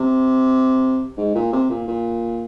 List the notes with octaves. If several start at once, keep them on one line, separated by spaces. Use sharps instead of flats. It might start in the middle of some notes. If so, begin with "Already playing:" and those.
Already playing: C3
G#2
A#2
C3
A#2
A#2